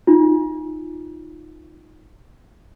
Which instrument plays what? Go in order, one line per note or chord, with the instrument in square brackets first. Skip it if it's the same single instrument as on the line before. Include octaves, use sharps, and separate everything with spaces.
[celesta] D#4 F4